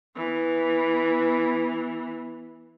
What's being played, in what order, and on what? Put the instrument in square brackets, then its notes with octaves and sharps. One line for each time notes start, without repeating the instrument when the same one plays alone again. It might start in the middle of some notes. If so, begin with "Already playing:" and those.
[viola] E3 B3